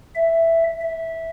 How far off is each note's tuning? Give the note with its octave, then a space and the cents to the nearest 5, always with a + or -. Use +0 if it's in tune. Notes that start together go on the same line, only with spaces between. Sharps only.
E5 +5
E5 -10